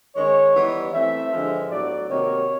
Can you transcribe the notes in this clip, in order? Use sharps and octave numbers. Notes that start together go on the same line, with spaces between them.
D#3 G#3 C#4 C#5
E3 G3 B3 D#4
E3 A3 C4 E5
G2 D3 F3 G#3
A2 F#3 B3 D4 D5
C3 D#3 F#3 A#3 C#5